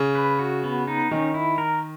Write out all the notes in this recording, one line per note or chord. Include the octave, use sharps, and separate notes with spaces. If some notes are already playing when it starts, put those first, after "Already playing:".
Already playing: C#3
B4
F#4
B3
D#4
D#3 C#4
E4
A#4